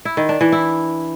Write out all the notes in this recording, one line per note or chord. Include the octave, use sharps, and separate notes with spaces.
E4
D#3
D4
E3
E4